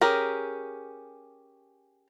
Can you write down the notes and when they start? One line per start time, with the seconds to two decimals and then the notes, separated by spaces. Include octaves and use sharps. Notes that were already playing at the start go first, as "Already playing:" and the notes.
0.01 C#4 G4 G#4 A#4